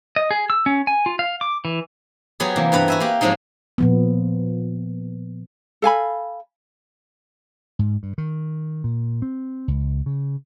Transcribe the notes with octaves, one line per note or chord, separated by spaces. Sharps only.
D#5
G#4
E6
C#4
G#5
F4
F5
D6
E3
F#3 B3 G4 G#4
C3 E3 A#3
G2 B3 B4 A#5
F#4 E5 G#5
A#3 G4
G#2 F3 F#3 G#3 C4 D#4
A#2 F3 B3
A4 F5 G#5 B5
G#2
G2
D#3
A#2
C4
C#2
C#3